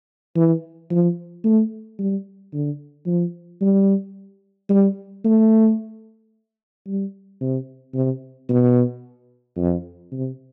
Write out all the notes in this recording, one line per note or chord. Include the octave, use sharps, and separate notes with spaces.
E3
F3
A3
G3
D3
F3
G3
G3
A3
G3
C3
C3
B2
F2
C3